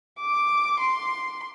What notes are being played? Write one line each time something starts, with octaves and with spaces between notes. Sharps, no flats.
D6
C6